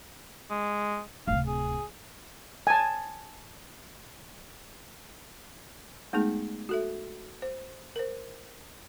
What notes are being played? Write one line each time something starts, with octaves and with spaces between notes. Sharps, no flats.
G#3
D1 C3 F5
G#4
G#5 A5
G#3 A3 B3 D#4 G#4
F#4 A4 E5
C5
A#4 C5